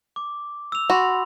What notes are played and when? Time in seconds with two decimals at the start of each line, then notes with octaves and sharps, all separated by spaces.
0.16 D6
0.72 E6 F7
0.90 F#4 B5 C6